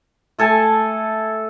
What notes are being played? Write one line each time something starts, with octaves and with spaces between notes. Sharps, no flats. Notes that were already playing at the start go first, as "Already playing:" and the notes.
A3 A4 G#5 A5